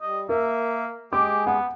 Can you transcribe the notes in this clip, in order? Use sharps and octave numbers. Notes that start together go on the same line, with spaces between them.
G3 D#5
A#3 A#4 E5
G#3 G4 G#4 D6
B3 F#5